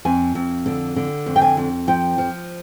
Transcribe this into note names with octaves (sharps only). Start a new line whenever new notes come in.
F2 G#5
F2
D3
D3
F2
G5
G#5
F2
F3 G5
F3